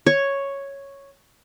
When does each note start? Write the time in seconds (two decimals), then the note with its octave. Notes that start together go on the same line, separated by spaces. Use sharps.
0.06 C#5